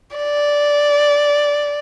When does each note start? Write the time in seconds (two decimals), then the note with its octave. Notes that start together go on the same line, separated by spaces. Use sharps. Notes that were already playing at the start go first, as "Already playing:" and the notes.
0.17 D5